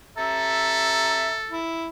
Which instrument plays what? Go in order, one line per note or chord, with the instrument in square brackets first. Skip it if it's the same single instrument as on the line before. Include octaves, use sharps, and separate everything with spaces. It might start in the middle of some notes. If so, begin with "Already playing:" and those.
[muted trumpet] A4 [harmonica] E5 A#5
[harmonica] E4